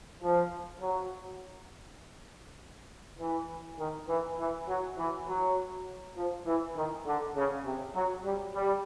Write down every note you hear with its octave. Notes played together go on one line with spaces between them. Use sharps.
F3
F#3
E3
D#3
E3
E3
F#3
E3
F#3
F3
E3
D#3
D3
C#3
C3
F#3
G3
G3